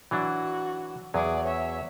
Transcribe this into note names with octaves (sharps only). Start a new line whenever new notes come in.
E3 F#3 D4 F#4
E2 F#3 G#4 D5
C#5 E5